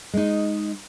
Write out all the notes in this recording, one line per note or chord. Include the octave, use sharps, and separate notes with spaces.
G#3 D#4